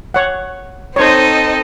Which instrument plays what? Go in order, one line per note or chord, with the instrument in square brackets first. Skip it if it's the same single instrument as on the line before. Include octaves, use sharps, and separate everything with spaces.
[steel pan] C#5 F#5
[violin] C4 D#4 [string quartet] A4 D#5 [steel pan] C5 C#5